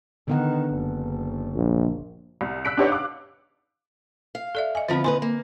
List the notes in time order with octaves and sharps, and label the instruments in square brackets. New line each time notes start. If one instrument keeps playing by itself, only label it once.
[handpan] D3 B3 F#5 [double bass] D#3
[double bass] F#1
[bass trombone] A#1
[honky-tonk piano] C2
E6 F#6 B6 D7
D4 D#4 G4 B4 C#5 F#5
F5 D6 F#6
[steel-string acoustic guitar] F5
[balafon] A4 D5 E5
D#5 G#5
[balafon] D3 C4 B5 [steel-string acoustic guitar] F3 B3 F4
[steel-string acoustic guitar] D#2 D#4 B4 [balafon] G#5 C6
[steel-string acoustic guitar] A#3